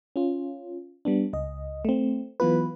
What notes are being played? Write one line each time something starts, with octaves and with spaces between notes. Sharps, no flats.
C#4 F4
G3 B3 D4
C#2 D#5
A3 C4
E3 F#3 B3 F4 B4